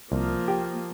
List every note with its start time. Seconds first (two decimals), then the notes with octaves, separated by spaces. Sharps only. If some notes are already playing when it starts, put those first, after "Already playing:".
0.12 C2 F3 A#3
0.48 G4 G5